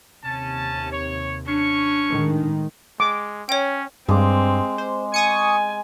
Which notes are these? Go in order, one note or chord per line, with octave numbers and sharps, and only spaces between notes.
D#2 C3 C#4 A5
C#5
C#4 D4 C#5 C#6
A2 D#3 G#3
G#3 D6
C#4 C#5 G5
G2 G#3 C4 D6
C5
G#5 C#6 D#6 C#7